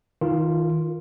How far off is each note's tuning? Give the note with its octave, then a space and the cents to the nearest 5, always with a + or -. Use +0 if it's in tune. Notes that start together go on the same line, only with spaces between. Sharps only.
D#3 +35 F4 +0 A#4 -30